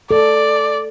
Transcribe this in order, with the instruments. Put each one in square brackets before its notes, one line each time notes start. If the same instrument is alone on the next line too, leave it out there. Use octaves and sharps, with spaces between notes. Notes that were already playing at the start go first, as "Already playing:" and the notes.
[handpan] A4 [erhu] D5